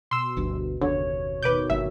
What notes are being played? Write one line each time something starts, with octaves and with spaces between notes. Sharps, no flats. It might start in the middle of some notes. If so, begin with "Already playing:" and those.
B2 C6 E6
G1 D2 G2
F#1 D#2 D3 C#5
B2 D#3 B4 D6 G6
G1 A#3 E5